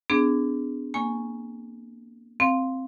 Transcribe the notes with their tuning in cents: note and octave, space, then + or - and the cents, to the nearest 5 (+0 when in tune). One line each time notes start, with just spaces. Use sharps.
B3 +45 D4 +0 G#4 +0
A#3 +0 G#5 +0 C#6 +0
C4 +0 F5 +0 C6 +0